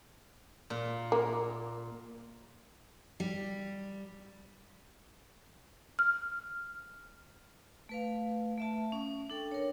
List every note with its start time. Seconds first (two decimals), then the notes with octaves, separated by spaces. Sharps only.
0.70 A#2
1.12 A#3
3.20 G3
5.99 F6
7.89 A3 B4 F5
8.58 A3 E5 A5
8.92 C#4
9.30 D4 A4 G5
9.51 A#4 C#5